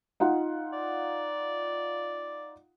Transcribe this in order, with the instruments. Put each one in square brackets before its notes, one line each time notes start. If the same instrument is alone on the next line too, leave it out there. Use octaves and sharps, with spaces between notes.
[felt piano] D#4 F4 F#5
[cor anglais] D5